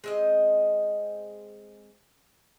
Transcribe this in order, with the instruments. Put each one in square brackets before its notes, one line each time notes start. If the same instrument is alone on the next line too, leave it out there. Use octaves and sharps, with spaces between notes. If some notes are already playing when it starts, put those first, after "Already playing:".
[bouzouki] G#3 C4 D#5